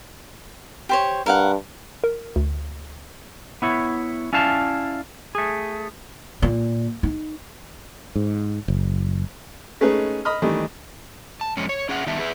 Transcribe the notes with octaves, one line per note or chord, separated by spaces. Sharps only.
G4 C5 C#5
G2 A#4 F5 F#5
A#4
D2
B3 E4 C#5
C#4 E4 D5 F5 A5
A3 G#4
A#2
D#4
G#2
F#1
G#3 A3 C#4 D#4 G#4 B4
D#5 B5 D#6 F6
D#3 E3 G3 A3
A5
F2 G#3 C#4
C#5
C#4 G#4 E5 F#5
D#3 G3 B3 E5 A5
G#4 B4 E5